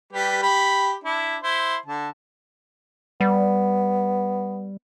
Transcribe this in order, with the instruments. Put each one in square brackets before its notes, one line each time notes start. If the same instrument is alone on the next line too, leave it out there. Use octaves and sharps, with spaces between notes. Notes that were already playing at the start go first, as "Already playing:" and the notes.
[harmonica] G3 G4 B4
G4 B5
D4 E4
E4 C5
D3 A5
[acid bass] G3 [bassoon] B3